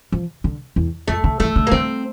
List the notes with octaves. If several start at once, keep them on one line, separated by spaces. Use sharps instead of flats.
F3
D3
E2
F2 A3
D3
E3 A3
D3
A#3
D3 C4